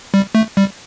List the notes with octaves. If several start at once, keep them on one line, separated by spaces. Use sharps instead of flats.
G3
A3
G3